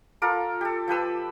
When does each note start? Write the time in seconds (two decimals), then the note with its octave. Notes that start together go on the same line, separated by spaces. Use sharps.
0.22 F4 A4 A#4 D6
0.61 G4 A4
0.88 F3 G4 B4 E6